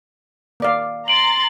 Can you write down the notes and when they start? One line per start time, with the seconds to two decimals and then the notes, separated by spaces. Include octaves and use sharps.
0.60 A#3 D5 F5
1.08 A#5 C6 A6 D7 F#7